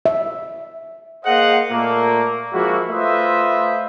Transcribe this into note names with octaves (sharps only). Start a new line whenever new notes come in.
E5
A#3 G#4 C5 D#5 F5 F#5
A#2 A3 A#3
F3 G#3 A#3 E4 F#4
A3 F4 B4 C5 D#5 E5